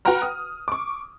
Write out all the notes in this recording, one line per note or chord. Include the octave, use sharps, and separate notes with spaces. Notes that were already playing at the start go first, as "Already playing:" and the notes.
F#4 B4 F#5 G5 A#5 F6
D#6
C#6 D6